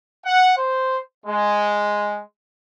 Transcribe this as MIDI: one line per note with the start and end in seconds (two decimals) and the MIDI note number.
0.25 0.52 78
0.57 0.98 72
1.25 2.21 56